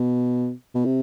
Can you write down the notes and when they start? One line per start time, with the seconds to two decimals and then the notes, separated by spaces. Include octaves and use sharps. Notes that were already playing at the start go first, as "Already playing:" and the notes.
Already playing: B2
0.75 B2
0.85 C3